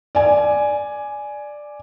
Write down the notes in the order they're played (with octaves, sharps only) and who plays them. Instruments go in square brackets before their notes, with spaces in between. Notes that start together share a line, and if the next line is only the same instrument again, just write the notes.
[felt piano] D5 G#5